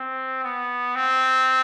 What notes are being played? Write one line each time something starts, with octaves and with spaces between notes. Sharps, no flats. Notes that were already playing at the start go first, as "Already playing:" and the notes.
Already playing: C4
B3
C4